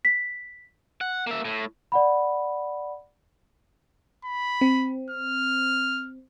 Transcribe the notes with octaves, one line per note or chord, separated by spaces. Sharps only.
B6
F#5
A#3 E5
A2
D5 F#5 B5
B5
C4
F6